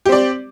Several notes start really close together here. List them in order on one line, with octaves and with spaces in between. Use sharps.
G4 C4 D5